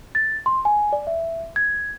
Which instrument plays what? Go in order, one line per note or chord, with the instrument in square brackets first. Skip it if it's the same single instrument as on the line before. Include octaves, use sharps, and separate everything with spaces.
[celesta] A6
C6
G#5
D5
E5
G#6